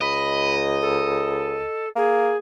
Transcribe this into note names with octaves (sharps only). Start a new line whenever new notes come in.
C#2 D#5 B5
A4
A#3 G#4